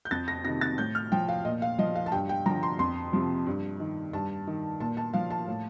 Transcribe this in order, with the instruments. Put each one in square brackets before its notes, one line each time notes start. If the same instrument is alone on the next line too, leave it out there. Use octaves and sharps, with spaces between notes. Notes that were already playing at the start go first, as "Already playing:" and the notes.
[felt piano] G6
F2 A6
A#6
C3 D#3 A#6
A6
A2 G6
F6
F3 G5
F5
A#2 D#5
F5
F3 D#5
F5
A5
G2 G5
G5
F3 A#5
D3
C6
F2 C6
C3 F3
G2
D#3
G2 A5
D#3
A#2 A5
A5
F3 F5
A5
A2